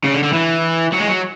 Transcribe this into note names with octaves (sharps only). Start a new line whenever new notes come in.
C#3
D3
D3
E3
F#3
G#3
F#3